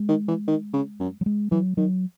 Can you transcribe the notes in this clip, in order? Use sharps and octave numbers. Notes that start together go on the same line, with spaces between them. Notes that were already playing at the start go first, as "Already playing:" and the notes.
Already playing: G#3
D#3
E3
D#3
C#3
F#2
F#3
G#3
E3 F#3
D#3 F#3